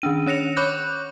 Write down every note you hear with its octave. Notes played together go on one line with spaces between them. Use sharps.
D#3 C#4 D4 D#7
C#4 C#5 A#6 C#7 F7
C#5 B5 C#6 D6 F#6 G6